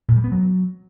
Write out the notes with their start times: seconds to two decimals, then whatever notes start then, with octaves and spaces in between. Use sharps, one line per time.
0.08 A#2
0.16 G3
0.24 B3
0.32 F#3